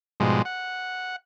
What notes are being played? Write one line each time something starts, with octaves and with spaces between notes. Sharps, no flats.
G#2 B2 F3 G3 G#3
F#5